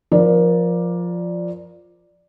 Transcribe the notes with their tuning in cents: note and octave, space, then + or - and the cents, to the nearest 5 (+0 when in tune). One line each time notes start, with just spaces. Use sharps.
F3 +5 A#4 +25 D5 +0